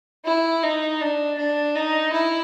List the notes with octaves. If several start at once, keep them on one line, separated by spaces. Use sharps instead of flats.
E4
D#4
D4
D4
D#4
E4